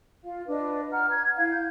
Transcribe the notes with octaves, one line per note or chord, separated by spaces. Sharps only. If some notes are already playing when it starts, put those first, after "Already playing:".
F4 F5
D4 B4 D#5
F#5 A#5 F6
G#6
E4 F5 G#6
G6